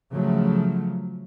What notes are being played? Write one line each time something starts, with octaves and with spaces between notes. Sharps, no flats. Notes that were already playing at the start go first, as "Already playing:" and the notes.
C#3 F3 F#3 A3